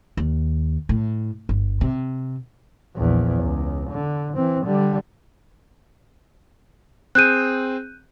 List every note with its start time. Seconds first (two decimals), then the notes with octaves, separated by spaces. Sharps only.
0.17 D#2
0.89 A2
1.49 G1
1.81 C3
2.97 A#1 E2
3.42 C#2
3.90 D3
4.36 E3 C4
4.66 D3 G3
7.15 C4 G#4 F#6 G6 D#7